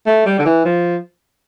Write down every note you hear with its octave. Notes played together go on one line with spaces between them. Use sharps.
A3
G3
D3
E3
F3